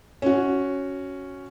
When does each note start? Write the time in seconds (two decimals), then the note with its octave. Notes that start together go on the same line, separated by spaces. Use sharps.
0.22 C#4 F#4